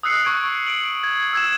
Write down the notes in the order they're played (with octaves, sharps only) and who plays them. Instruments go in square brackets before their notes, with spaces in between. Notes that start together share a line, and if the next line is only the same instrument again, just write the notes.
[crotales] D#6 E6 F#6 C7 C#7
C#6 G#6 D7
D7 F#7
G#6
E6 G#6 E7